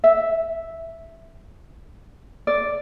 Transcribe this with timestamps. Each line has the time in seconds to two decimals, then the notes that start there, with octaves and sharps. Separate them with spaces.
0.04 E5
2.47 D5